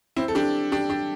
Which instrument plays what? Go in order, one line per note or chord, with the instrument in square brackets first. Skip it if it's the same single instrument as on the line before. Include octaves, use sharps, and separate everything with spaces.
[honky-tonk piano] C4 E4
A4
D4 G4
D4 G4
D4 G4